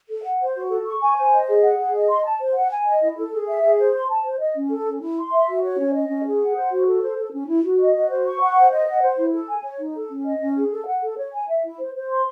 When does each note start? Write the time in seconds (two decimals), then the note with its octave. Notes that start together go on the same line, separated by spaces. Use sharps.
0.10 A4
0.24 F#5
0.40 C5
0.56 F#4
0.70 A4
0.86 C#6
1.01 G#5
1.17 C5
1.32 D#5
1.48 G#4
1.63 F#5
1.78 G#4
1.94 D#5
2.09 C6
2.24 A5
2.40 C5
2.55 F#5
2.71 G#5
2.86 D#5
3.02 E4
3.17 A4
3.33 G#4
3.47 E5
3.63 G#4
3.79 C5
3.94 C6
4.10 A5
4.25 C5
4.40 D#5
4.55 C#4
4.71 A4
4.86 C#4
5.02 E4
5.17 C6
5.32 E5
5.48 F#4
5.63 C#5
5.79 C#4
5.94 D#5
6.09 C#4
6.25 G#4
6.41 F#5
6.56 C5
6.71 F#4
6.86 A4
7.02 C5
7.17 A4
7.33 C#4
7.48 E4
7.63 F#4
7.79 D#5
7.95 F#4
8.10 C5
8.25 C#6
8.40 F#5
8.56 C5
8.71 D#5
8.87 F#5
9.02 C5
9.17 E4
9.33 A4
9.48 G#5
9.64 C#5
9.79 D#4
9.95 A4
10.10 C#4
10.26 D#5
10.41 C#4
10.56 G#4
10.71 A4
10.87 F#5
11.02 A4
11.17 C#5
11.33 G#5
11.48 E5
11.64 E4
11.79 C5
11.95 C5
12.10 C6